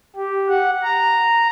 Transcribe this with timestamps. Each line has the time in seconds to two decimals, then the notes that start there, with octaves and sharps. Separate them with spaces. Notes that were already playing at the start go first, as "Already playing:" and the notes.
0.16 G4
0.49 F#5
0.83 A#5